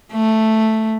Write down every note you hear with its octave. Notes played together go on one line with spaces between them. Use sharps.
A3